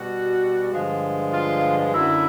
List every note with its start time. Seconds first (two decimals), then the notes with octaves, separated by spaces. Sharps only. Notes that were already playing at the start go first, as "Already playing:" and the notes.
Already playing: B2 G3 F#4
0.72 G2 D3 F3 G#3
1.32 F4
1.93 F#2 D3 F#3 E4